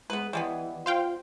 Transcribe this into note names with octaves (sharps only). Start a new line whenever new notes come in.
G#3 B3 B4
E3 G3 G#3 B3
F4 C5 F5 G5